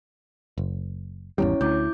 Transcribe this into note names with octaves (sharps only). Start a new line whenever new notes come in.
F#1
G#1 E2 G3 C#4 E4 C#5
D2 E4 D6 G6